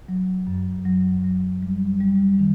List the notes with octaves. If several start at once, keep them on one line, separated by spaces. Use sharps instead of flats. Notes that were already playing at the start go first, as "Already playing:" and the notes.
F#3
F#2
F#3
F#3
G3
G3
D#3